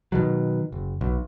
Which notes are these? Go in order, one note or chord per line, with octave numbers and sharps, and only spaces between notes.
B2 D#3 F#3
F#1
B1